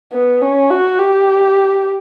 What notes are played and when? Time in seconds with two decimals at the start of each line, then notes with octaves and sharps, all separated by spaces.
0.13 B3
0.42 C#4
0.70 F#4
0.99 G4